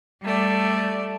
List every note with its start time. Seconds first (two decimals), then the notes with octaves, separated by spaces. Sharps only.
0.22 G3 A3 D5